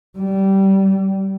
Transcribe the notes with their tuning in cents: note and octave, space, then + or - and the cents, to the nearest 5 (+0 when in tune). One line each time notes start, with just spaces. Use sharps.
G3 -20